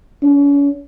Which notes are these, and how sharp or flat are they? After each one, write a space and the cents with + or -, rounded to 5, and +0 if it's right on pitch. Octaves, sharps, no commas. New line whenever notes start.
C#4 +40